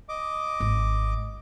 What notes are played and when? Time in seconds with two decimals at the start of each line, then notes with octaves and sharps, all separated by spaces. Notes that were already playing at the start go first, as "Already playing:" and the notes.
0.09 D#5 D6
0.60 G#1